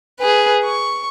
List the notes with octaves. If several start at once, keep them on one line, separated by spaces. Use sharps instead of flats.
G#4 B4
C#6